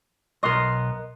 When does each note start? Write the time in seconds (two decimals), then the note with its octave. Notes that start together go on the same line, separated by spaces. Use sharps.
0.43 B1 B3 A#4 D#5 C6